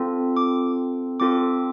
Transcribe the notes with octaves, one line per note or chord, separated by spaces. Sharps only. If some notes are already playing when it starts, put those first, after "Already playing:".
Already playing: C4 F4 A4
D6
C4 F4 A4 D6